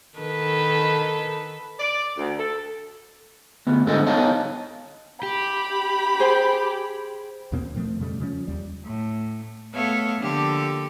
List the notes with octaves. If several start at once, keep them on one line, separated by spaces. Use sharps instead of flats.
D#3 A4 B4
D5
D2
A4
D2 B3
G#2 D3 A4 C5 D#5
B3 D#4 C#5 D#5 F5 A5
G4 B5
G#4 C5 G5
D#2 B2 A#3 C4
B2 F3 A3 C4
F2 C#3 G3 A3
C#3 F3 A3 C#4
D#2 G3
A2
A3 B3 A4 C#5 E5 F5
D3 F3 A#3 G4 A4